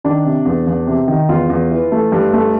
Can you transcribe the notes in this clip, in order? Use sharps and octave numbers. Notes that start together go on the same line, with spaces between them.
D#3 D4
C3
E2
E2
C3
D#3
E2 F4
E2
E3
A3
G2
A3